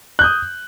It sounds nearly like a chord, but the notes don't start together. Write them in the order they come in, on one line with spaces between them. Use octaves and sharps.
F#6 G6 D#6